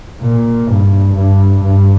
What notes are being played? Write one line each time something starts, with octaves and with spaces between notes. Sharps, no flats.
A#2
G2
G2
G2